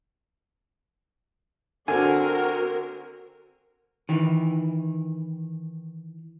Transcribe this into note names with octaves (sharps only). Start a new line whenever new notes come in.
D3 C4 F#4 A#4 G#5
D#3 E3